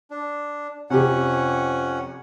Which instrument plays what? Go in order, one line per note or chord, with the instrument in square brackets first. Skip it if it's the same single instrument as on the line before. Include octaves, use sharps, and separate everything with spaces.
[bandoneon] D4
[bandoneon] F2 C#4 F#5 [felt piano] C3 G4